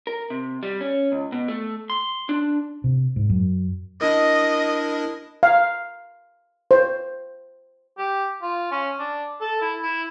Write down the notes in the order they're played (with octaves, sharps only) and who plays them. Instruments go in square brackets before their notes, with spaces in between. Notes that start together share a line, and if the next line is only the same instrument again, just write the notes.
[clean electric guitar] A#4
C3
G3
C#4
C#2
B2
A3
C6
D4
[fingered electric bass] C3
G#2
F#2
[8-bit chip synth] D4 E4 A#4 [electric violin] D#5
[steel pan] F5
C5
[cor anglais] G4
F4
C#4
D4
A4
E4
E4